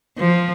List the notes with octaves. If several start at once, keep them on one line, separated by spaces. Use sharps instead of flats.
F3